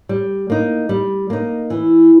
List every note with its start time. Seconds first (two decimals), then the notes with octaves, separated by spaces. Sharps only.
0.09 G3
0.50 A#3 D#4
0.89 G3
1.30 A#3 D#4
1.70 E3